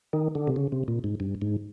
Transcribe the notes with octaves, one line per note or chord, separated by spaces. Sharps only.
D#3
D3
C3
C#3
C3
A#2
G#2
G2
G#2